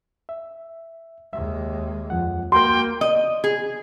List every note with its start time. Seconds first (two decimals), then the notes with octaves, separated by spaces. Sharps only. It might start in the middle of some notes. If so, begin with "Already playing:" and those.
0.29 E5
1.33 D#2 G#3 E5
2.10 F2 F3 F#5
2.52 A#3 F#4 A#4 G5 C6
3.01 D#5
3.44 G#4